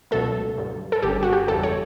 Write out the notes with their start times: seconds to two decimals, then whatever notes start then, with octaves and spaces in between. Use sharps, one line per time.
0.11 C#2 B2 F#3 A3 A4
0.57 G2 D3 F#3
0.92 A4
1.02 G1 G2 D3 G3 C#4 G4
1.23 F#4
1.33 G4
1.48 E2 C#3 G3 A4
1.63 C#5